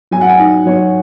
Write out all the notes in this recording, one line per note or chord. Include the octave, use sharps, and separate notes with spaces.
F#3 G#5
F#5
G#5
D#4
F#3 C#5